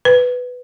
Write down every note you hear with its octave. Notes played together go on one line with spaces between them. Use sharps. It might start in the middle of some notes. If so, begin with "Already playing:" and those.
B4